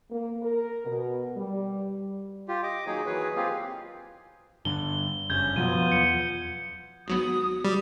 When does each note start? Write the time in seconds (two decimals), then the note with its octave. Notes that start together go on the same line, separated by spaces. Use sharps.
0.11 A#3
0.42 A#4
0.86 B2
1.36 G3
2.48 F4 G4
2.63 D#5 D6
2.87 D#3 F#3 A#3 D#4 G#4 C#5
3.06 D#3 E3 F#3 G#4 B4 C#5
3.36 A#3 C4 F4 G4 G#4 F5
4.65 G2 D3 G7
5.30 F#1 G2 C#4 G6 G#6 G7
5.56 B2 F3 F#3 B3 F4 D#7
5.92 E2 C#7
7.08 G#1 F#3 B3 F#4 D#6
7.65 G3